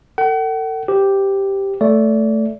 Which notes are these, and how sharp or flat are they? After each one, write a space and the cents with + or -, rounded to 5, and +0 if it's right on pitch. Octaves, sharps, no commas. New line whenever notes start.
A4 +40 F#5 +40
G4 +0 C5 -40
A3 +0 D5 -30